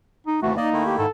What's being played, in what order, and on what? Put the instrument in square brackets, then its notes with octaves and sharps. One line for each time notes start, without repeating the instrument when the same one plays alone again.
[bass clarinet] D#4
[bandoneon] D#2 C3 E3 [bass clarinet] A3 [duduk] F#4
[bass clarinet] A#3 [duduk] D#4 [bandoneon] D5 D#5
[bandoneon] D#3 A3 E4
[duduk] G4
[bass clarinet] G#2 [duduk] A4